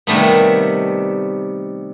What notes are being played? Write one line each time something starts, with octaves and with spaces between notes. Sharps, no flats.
C3 D#3 G3 A3 B3